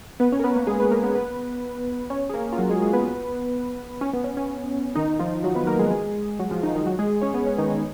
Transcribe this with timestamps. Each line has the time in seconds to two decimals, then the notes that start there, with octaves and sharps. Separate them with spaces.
0.20 B3 B4
0.32 C#4 C#5
0.39 A#4
0.44 B3 B4
0.55 A#3 A#4
0.67 G#3 G#4
0.80 B3 B4
0.91 A#3 A#4
1.03 B3 B4
1.15 B3 B4
2.10 C#4 C#5
2.29 G#4
2.34 A#3 A#4
2.52 F4
2.58 F#3 F#4
2.69 G#3 G#4
2.81 G#3 G#4
2.93 B3 B4
4.01 C#4
4.13 B3
4.24 C#4
4.37 C#4
4.96 D#3 D#4
5.19 F3 F4
5.44 F#3 F#4
5.55 B3 B4
5.67 A#3 A#4
5.79 G#3 G#4
5.91 G#3 G#4
6.39 F#3 F#4
6.51 F3 F4
6.63 D#3 D#4
6.75 D#3 D#4
6.86 F#3 F#4
6.99 G#3 G#4
7.22 C#4 C#5
7.34 B3 B4
7.47 C#4
7.58 D#3 D#4
7.70 D#3 D#4